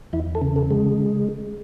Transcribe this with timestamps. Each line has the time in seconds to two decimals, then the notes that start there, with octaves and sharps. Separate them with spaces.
0.13 E2 E4
0.35 A4
0.42 C#3
0.56 A4
0.70 G#3